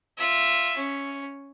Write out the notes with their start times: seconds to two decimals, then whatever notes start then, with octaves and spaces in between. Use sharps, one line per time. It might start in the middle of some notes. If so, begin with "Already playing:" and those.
0.17 F4 E5
0.76 C#4